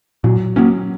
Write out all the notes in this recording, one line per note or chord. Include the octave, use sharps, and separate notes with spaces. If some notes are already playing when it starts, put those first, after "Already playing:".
A#2 F#3
F#3 A#3 C#4